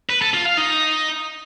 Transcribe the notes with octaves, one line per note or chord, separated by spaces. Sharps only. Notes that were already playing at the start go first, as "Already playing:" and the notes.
B4
A4
F4
F5
D#4